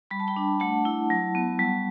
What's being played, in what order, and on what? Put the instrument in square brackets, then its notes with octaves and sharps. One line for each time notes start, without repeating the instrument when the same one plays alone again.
[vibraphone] G3 B5
A5
G5 B5
D4
A3 F#5 A5
E4
F#3
B3
G3